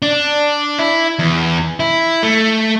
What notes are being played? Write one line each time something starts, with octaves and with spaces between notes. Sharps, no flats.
D4
E4
E2
E4
A3